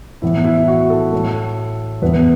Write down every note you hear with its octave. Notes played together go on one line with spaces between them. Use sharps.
A2 E3 B3 E4
E4
E4
F#4
A4
A2 A3
E2 E3 B3 B4